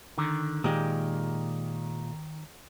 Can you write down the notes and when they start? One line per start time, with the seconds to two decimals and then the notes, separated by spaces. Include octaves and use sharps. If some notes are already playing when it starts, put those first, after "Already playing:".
0.18 D3 D#3
0.64 A#2 D#3 G#3 G4